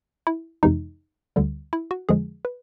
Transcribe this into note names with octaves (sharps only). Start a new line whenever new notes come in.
E4
F2 C3 E3 G#3 D#4
D2 D3 G3
E4
F#4
F2 D3 F3 G#3 G#4
B4